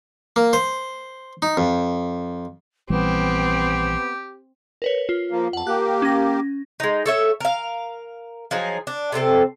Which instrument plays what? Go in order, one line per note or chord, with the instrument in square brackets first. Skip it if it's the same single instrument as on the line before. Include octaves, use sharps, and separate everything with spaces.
[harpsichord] A#3
C5
D#4
F2
[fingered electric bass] A#1 E3 G3 [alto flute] B3 [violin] C4 [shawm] G4
[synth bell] A#4 B4 C#5
F4
[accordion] F3 A#3
[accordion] F2 [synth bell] F#5 A5
[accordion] A#3 G4 [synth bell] F#6
[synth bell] C#4 A#6
[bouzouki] G#3 D#4
A4 C#5 E5
A#4 F5
F3 F#3 D#4 G#4
D4
C3 A3 C4 A4